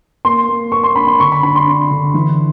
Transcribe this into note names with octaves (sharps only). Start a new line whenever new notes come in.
A#3 C6
A#3
A#3 C#6
C6
D4 B5
C6
D3 C#6
B5
D4 B5
C6
D4
D3
E3